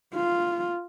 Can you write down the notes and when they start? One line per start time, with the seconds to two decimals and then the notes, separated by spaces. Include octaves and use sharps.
0.15 F4